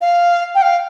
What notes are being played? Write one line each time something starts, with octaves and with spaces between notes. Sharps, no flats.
F5
G5
F5